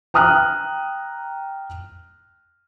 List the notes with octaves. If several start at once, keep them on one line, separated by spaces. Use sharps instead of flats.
G5 A#5 D#6 F6 F#6